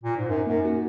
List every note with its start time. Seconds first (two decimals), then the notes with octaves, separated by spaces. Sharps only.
0.03 A#2
0.16 G#2
0.29 F#2 D#4
0.47 F#2 A#3
0.65 F#4